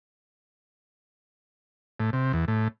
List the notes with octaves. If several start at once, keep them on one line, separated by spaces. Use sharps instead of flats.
A2
C3
E2
A2